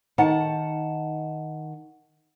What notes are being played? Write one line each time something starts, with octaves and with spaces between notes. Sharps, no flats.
D#3 F#5 A5